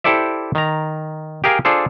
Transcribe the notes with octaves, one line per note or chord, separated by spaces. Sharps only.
E4 G4 A4 C5 D5 E5
D#3 A#5
G4 G#4 A#4 F5 G5 G#5
D4 F4 G#4 A4 C5